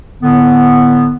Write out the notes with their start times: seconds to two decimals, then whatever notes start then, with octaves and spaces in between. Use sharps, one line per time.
0.21 A2 D3 B3